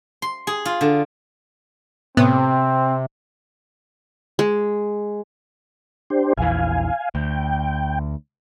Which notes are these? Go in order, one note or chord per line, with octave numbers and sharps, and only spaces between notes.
C6
G#4
F4
D3
A2 C3 B3 C4
G#3
D4 G4 C5
A#1 E2 E3 F5 G#5
D2 G5